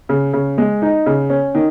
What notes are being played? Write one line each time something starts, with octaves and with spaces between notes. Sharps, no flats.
C#3
C#3
G#3
D#4
C#3
C#4
D#3